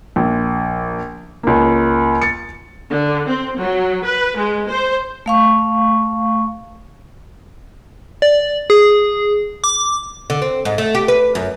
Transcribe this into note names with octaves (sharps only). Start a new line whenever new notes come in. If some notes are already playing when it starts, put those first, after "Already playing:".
A#1
C#2 A#3
A6 C#7
D3
C4
F#3
B4
G#3
C5
A3 F5 C#6
D5
G#4
D6
D3
C4
G#2
A3
G4
B4
F#2